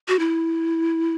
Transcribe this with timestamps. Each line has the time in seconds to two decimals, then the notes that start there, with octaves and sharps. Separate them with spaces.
0.08 F#4
0.19 E4